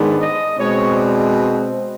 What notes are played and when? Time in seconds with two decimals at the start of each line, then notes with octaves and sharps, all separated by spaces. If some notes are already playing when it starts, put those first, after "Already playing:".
Already playing: G#2 D#3 G#3 B3 D4
0.20 D#5
0.57 B2 G#3 C4 C#5
0.95 D5